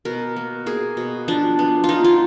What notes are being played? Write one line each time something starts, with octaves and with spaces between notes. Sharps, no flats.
B2 A#4
A#3
A#3 G#4
B2
F3 D4
B3
F4
B3 D#4
F4